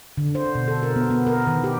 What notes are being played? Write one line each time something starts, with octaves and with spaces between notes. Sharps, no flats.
D3
C5
B2
A4
A#4
B3
B3
A#4
D#3
G4